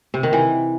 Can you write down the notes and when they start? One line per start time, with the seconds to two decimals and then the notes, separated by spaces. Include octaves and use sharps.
0.14 C3
0.23 D#3
0.33 E3